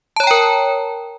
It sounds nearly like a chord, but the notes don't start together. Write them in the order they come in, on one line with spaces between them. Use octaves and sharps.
A5 C#5 A#5 G5 A#4